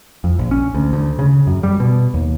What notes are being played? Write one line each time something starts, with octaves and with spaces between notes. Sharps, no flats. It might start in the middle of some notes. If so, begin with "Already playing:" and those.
F2
A#1
C#4
D2
D2
C#3
F#2
G3
B2
D#2